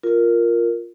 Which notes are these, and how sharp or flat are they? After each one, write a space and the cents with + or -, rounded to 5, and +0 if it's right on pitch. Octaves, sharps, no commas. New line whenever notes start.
F4 +0 A#4 +0